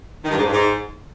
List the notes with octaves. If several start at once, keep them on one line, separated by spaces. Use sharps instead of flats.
D#3
G2
G#2
G2
G#2